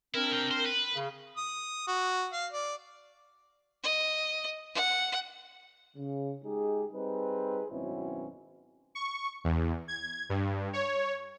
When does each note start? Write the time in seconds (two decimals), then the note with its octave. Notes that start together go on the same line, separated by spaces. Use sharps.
0.14 C4 D4 E4 A#4
0.32 C3 G5
0.51 C5
0.65 B4
0.94 C#3
1.37 D#6
1.88 F#4
2.33 F5
2.52 D5
3.83 D#5
4.75 F#5
5.97 C#3
6.44 G#3 D#4 G4 G#4
6.92 G3 C4 D#4 G#4 B4
7.70 G#1 F#2 B2 C4 C#4 E4
8.95 C#6
9.44 E2
9.88 G#6
10.29 G2
10.73 C#5